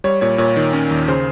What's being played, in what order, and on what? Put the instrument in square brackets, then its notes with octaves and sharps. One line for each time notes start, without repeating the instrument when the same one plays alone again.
[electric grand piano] G3 [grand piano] C#5
[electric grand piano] A#2 [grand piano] C#5
[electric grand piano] A#2 [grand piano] C#5
[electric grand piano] D#3
C#4
D#2
[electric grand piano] C#3 [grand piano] C5